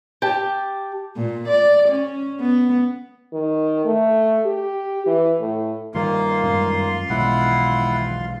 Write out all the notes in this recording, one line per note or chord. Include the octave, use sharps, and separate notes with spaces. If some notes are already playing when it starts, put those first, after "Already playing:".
G4 A5
A#2
D5
C#4
B3
D#3
A3
G4
E3
A2
G2 D#3 G3 A#3 F4 F5 C6
F#2 G#3 C#4
E1 B1 B2 D#3 G#3 E4 F#5